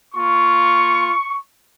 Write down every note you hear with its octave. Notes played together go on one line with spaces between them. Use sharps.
A#3 F4 C#6